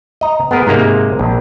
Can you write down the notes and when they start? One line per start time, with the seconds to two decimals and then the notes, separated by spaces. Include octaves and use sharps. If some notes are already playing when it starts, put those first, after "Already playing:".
0.21 D#5 A#5
0.51 B3 G#4 A#4
0.67 G#2 C3 G#3 A#3
1.19 A#1